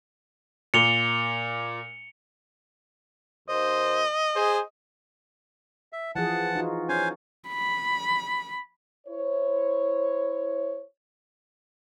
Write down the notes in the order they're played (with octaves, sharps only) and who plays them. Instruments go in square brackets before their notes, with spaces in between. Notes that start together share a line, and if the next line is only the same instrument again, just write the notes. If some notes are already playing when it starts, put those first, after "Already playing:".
[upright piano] A#2 [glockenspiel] C#7 F7 G7
[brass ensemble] D#2 C5 [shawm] D#5
[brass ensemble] G#4 C5
[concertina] E5
[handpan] E3 F3 G#4 [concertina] F#5 A5
[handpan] D#4 F4 F#4
[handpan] C#4 [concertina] C5 F5 G#5
[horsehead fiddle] B5
[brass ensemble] E4 C5 C#5